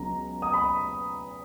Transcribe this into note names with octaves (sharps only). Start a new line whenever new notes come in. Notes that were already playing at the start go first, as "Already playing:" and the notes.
Already playing: C#2 C#3 F#3 B3 A#5
D#6
B5